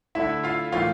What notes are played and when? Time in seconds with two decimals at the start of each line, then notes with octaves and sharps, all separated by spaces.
0.15 D3 A3 E4 E5
0.43 F4 F5
0.72 A2 E3 A#3 C#4 F4 F5